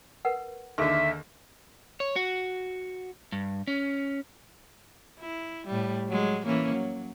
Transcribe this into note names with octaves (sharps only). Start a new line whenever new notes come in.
A#4 B4 F#5
D#2 D3 G#4 A4 E5 C6
C#5
F#4
G2
C#4
E4
A2 G3
F#3 G#3
E3 A#3 C#4
F#3